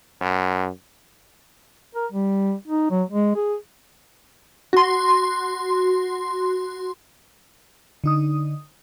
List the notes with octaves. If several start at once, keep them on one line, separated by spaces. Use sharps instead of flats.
F#2
A#4
G3
D#4
F#3
G#3
G#4
F#4 C6
D3 D#4 D#6